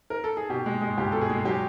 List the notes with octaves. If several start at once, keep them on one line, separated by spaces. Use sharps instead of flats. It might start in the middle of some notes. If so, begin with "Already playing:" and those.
A#4
A4
G#4
B2 G4
G#3
G#3
C#2 G4
B2 A4
G#4
G#3
F#3 G4